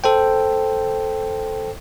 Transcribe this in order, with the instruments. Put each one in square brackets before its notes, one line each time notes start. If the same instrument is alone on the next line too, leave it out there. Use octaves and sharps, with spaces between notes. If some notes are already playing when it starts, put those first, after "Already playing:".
[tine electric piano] A4 C5 G5